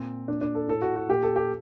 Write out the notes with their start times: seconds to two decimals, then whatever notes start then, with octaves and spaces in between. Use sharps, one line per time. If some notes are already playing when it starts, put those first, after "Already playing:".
Already playing: A#2 C4
0.28 A#2 D4
0.41 D4
0.55 A4
0.68 A2 A4
0.82 F#4
0.96 F#4
1.09 A#2 G4
1.23 A4
1.36 G4